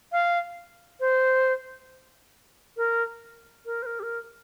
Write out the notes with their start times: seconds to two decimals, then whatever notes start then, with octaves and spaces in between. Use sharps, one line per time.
0.12 F5
1.00 C5
2.77 A#4
3.66 A#4
3.83 C5
3.86 A#4
4.00 G4
4.03 A#4